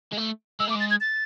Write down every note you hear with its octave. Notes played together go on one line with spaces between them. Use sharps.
G#3
A3
G#3 E6
A3 D6
G#3
A6
G#6
A6